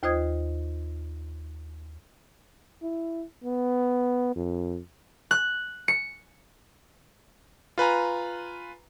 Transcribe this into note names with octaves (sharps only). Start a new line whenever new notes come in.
D#2 F4 C5 D#5 D#6 G#6
E4
B3
F2
F#6
C#7
F4 B4 G#5 A#5